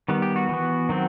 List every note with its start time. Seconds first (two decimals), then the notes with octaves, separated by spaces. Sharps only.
0.08 D#3 G3 B3
0.22 G4
0.36 F#4
0.49 E3 B3
0.89 D#3 F#3 C4